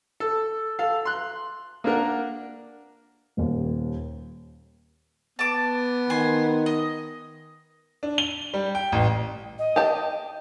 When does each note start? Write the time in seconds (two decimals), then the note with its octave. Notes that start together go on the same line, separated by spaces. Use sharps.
0.20 A4
0.79 A4 F5
1.05 C6 F#6
1.84 A#3 D4 A#4 F#5
3.37 D#1 D#2
5.39 B3 A5 D6
6.10 D#3 G#5 C6
6.66 D#5
8.03 D4
8.18 G7
8.54 G3
8.75 G5
8.92 A1
9.58 D#5
9.76 G4 A5